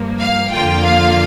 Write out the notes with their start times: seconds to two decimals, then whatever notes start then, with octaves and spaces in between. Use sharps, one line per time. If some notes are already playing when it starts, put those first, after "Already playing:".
Already playing: G2 F3 A#3
0.19 F5
0.51 F2 D3 F3 A#3 F4 G5
0.83 F5